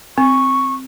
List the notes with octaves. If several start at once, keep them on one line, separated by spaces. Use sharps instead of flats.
C4 C#6